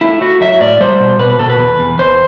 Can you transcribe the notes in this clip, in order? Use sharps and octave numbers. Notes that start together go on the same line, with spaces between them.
A3 E4
A3 F#4
F#3 E5
A2 D5
G3 C5
B2
B2 B4
B4
B2 A4
B4
E2
E2
E2 C5